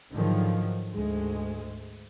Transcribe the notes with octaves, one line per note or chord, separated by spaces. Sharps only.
G#2 D3 D#3 F3 F#3
D2 G#2 G#3